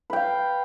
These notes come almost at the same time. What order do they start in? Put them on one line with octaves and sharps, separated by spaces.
B4 G5 F5